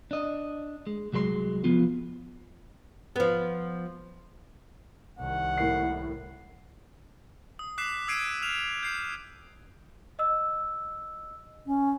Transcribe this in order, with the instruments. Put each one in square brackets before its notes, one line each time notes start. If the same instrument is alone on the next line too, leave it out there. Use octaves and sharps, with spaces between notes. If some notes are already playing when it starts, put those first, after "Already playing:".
[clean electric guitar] D4 D#5
G#3
C2 F#3 G#3 B4 C6
F3 B3 F4
[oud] F3 B3
[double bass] C2 D#3 [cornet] F#5
[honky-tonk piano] A2 A#3 C7
[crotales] D#6
D6 F#6 B6 C7 E7
D#6 E6 G#6 C7 D7 D#7
F6 E7 F7
G6 C7
[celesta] D#5 E6
[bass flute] C#4